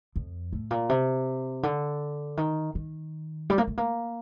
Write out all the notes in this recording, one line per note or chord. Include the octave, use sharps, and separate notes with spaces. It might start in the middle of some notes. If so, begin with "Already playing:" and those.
F2
A2
A#2
C3
D3
D#3
D#3
G3
A#3
A3
A#3